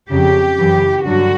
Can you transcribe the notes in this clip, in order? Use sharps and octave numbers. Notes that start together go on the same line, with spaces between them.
F2 C#3 F#3 G4
F#2 C#3 E3
G2 D3 F#3 F#4